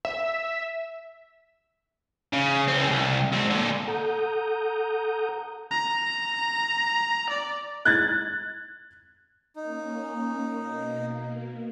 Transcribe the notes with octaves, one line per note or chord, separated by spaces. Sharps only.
E5
C#3
C#2 C4
C2
G#2 C4
A#2 D3
A4 F#5 A#5 D#6 G6
A#5
D5
F#6 G#6 A6
A#3 C#4 D#4
B2 A#3